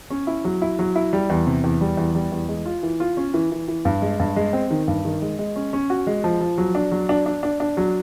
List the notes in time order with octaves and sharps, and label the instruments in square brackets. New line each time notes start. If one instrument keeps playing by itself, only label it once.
[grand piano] C#4
E4
F#3
E4
F#3
E4
G3
E2
C3
E2
G3
E2
G3
E2
G#3
F4
E3
F4
C#4
E3
E3
E3
G2
G#3
G2
G#3
C4
D#3
G2
D#3
G#3
G#3
C#4
C#4
F#4
G#3
F3
F3
F#3
D4
F#3
D4
D4
D4
D4
F#3